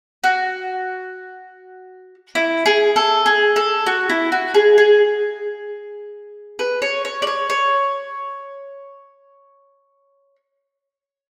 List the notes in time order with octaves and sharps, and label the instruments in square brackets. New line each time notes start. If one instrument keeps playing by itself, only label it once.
[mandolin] F#4
E4
G#4
A4
G#4
A4
F#4
E4
F#4
G#4
G#4
B4
C#5
C#5
D5
C#5
C#5